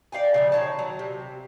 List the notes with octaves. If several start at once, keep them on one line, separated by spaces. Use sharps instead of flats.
D5 F5 G5 G#5
C#3 E3 F3
D#3 C#5 A5
F#3
C3